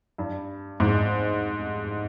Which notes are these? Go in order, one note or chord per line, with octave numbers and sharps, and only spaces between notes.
G2
G#2